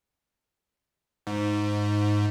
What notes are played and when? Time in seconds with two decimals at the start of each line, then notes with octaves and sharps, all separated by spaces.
1.27 G#2